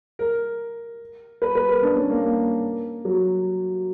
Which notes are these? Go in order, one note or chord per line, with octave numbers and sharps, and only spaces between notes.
A#4
B4
B4
A#4
D4
C#4
A#3
A#3
F#3